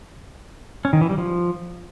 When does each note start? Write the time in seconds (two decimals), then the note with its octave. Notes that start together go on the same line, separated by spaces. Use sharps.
0.85 C#4
0.93 D#3
1.01 E3
1.09 G3
1.18 F3